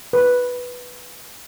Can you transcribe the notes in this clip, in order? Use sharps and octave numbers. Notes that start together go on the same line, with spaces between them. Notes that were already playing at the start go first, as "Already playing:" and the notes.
B4